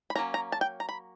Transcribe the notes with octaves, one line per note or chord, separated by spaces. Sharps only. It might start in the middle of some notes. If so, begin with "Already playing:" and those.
B5
F#3 A#3 C#4 A#5
A#5
A5
G5
A#5
B5